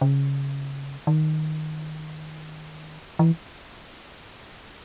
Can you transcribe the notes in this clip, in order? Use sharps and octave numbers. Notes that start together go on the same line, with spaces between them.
C#3
D#3
E3